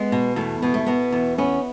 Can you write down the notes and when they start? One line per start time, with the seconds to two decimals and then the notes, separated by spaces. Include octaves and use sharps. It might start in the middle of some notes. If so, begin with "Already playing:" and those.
Already playing: G#3 B3
0.12 B2
0.36 E2 A3
0.62 B2 B3
0.74 A3
0.87 B2 B3
1.12 E2
1.38 B3 C#4